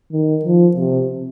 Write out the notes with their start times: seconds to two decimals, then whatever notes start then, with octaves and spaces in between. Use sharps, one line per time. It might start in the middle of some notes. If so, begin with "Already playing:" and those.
0.12 D#3
0.45 F3
0.76 C3